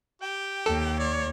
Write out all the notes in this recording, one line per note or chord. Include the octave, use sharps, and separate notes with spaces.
G4 G5
D#2 A4
C#5 D5